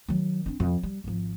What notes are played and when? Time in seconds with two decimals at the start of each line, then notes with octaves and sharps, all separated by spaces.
0.08 D#3 F#3
0.46 C4 D4
0.60 F2
0.83 G3
1.04 G#1 F3